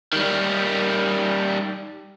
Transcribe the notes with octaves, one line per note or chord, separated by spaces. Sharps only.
D#3 G3